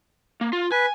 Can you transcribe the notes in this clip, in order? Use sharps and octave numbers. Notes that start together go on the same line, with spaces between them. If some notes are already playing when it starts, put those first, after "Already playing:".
A#3
F4
B4 G#5